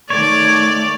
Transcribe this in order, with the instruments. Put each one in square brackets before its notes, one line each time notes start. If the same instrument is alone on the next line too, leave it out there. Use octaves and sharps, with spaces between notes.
[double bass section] D#3 A3 [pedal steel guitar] C#5 [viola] D5